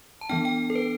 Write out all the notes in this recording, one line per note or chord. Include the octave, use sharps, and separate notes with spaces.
A5
E3 B3 D4 G5
G5
A4
B4